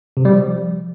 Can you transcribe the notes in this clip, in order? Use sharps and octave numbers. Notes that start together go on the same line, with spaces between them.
C3
G3
F3